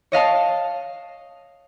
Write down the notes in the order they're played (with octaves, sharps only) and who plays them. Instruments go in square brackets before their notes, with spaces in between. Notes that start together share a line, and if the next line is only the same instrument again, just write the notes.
[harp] C#5 D#5 F5 A5